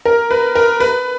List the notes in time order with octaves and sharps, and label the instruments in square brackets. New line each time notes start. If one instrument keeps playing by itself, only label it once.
[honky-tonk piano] A#4
B4
A#4
B4